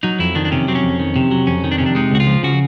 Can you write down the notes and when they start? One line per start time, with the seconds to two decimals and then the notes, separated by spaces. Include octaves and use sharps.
0.03 F#3 D#4
0.19 F2 E4
0.35 D#3 D4
0.45 D4
0.52 C3 C#4
0.68 F#3 C4
0.75 C#4
0.83 F2
1.00 D#3
1.16 C3
1.31 F#3
1.47 F2 C#4
1.64 D#3
1.72 D4
1.78 C3 C#4
1.86 D4
1.95 G#3 D#4
2.11 C#2 F#4
2.20 F4
2.27 F3
2.43 C#3 F#4